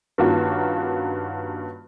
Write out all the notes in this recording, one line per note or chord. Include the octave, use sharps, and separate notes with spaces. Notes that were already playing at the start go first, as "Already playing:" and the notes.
G2 D#3 A#3 C#4 F4 F#4